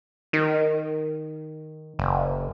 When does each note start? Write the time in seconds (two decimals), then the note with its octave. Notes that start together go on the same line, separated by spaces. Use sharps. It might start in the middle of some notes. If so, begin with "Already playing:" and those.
0.33 D#3
1.99 F#1